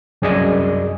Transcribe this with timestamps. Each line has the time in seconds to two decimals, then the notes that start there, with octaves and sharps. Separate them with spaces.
0.22 C2 F#2 G#4 D5 D#5 G#5